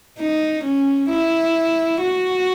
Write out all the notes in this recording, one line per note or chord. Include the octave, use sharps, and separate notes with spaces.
D#4
C#4
E4
F#4